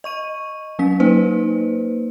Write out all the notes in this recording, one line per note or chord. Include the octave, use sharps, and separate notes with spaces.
D#5 C#6 D#7
F#3 C#4 B6
A#3 D#4 B4 C5